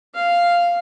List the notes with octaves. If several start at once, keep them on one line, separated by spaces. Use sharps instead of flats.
F5